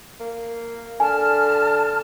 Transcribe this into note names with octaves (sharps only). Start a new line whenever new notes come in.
A#3
D3 G#5 A5 F6